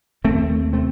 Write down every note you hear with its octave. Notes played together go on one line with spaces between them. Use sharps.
D#2 D3 A3 C4
C3 A3 C4